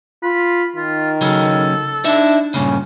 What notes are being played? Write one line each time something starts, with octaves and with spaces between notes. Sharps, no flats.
F4 B5
D#3 F4
C#3 F#3 C#4 A4
D4 D#4 E5
G2 A#2 C#3 C#4